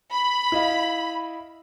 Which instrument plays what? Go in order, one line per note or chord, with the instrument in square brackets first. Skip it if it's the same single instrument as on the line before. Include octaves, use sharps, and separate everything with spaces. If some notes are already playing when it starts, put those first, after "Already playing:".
[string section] B5
[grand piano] E4 D#5 F5